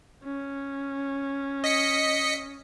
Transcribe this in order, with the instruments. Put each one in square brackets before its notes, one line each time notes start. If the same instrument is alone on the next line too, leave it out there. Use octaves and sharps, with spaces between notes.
[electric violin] C#4
[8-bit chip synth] D#5 B6 C#7